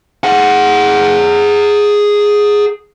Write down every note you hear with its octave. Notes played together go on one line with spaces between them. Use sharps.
G#4 F#5